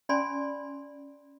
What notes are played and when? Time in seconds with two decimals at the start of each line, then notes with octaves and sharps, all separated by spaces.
0.09 C#4 D5 G#5 B5 C6